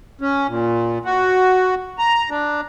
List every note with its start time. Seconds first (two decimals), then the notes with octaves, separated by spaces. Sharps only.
0.21 C#4
0.48 A#2
1.05 F#4
1.98 A#5
2.30 D4